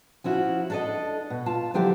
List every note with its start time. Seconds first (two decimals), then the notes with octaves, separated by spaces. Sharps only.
0.24 F3 C#4 E4 F#4
0.70 D4 A4 D#5
1.30 B2
1.46 F4 A5
1.74 D3 F3 F#3 E4 G4